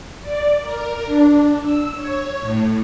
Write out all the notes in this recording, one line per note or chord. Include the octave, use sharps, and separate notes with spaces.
D5
A#4
D4
E6
C#5
A2